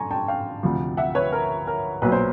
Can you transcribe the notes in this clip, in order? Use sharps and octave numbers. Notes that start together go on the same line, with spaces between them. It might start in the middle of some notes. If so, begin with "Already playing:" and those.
Already playing: D3 G#5 A#5 C6 C#6
G5 A5
F5 G5
D2 C3 F3
E5 F#5
B4 C#5
A#4
A#4
B1 A#2 F#3 B4
C5